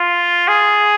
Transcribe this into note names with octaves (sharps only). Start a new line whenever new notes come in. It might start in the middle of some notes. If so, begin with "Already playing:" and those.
Already playing: F4
G#4